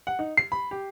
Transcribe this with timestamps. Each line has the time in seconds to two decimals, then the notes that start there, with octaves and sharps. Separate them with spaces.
0.07 F#5
0.19 D#4
0.37 C7
0.52 B5
0.71 G4